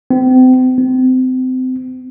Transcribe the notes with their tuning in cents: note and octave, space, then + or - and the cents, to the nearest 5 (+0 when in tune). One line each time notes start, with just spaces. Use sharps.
C4 -35
C4 -30